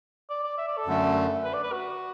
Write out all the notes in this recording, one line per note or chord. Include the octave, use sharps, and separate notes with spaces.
D5
D5
E5
D5
A4
F#2 D3 A3
B4
D5
B4
F#4